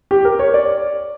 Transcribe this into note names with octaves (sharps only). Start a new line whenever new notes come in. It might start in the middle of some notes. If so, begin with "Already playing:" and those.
G4
A#4
C#5
D5